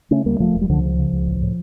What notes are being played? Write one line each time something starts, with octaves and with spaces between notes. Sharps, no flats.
C#3 A3 C#4
D2 G3 A#3
E1 F3 A3
E1
G3
C#2 D3 F3
C#3
C#3
C#2
A1
A2